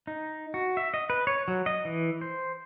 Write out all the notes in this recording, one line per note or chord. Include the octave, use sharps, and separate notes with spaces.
D#4
F#4
E5
D#5
B4
C#5
F#3
D#5
E3
C5